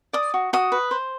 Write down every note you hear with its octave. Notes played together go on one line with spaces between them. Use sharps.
D5 D#6
F#4
F#4 D#6
B4
C5